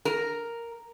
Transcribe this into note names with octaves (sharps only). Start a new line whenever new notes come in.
A#4